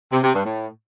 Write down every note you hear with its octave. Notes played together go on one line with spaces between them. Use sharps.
C3
C3
G2
A2